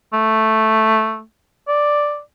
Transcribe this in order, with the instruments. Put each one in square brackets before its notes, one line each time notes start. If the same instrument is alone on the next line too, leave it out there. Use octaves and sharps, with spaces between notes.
[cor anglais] A3
D5